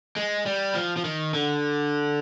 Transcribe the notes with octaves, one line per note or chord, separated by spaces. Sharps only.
G#3
G3
F3
F3
D#3
D3